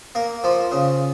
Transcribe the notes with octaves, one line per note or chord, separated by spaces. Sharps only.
A#3
F3
C#3